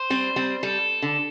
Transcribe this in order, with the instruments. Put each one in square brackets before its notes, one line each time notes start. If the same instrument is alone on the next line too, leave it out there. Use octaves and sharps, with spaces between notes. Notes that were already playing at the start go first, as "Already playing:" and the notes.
Already playing: [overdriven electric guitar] C5
[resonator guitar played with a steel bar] G3 C4
G3 C4
[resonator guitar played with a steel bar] G3 [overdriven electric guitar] A4
[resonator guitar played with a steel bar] D3